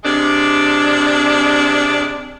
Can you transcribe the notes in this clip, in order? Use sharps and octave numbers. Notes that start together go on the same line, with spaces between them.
C3 G#3 D4